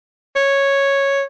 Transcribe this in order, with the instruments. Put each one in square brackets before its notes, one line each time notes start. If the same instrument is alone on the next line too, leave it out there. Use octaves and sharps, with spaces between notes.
[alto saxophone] C#5